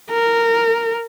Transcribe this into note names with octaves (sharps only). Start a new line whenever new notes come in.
A#4